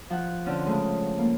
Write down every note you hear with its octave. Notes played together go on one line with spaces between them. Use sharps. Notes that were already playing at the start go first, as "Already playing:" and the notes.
F3 F#5 F#6
D3 C4 C#4 F6
C#3 G#3 A3
A#3